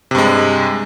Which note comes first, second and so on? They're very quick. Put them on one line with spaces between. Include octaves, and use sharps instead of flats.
C3 G2 G#3